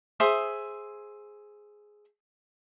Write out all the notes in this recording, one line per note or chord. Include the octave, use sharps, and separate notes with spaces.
G#4 C5 E5 D#6